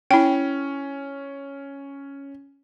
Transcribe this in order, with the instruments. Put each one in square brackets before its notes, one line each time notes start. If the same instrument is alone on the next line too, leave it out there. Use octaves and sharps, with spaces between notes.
[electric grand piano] C#4 [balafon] E4 G5